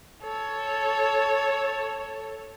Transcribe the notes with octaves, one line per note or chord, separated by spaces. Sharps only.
A4 C#5